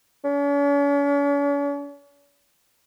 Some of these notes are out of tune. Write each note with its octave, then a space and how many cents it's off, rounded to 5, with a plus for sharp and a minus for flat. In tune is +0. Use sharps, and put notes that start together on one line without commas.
C#4 +45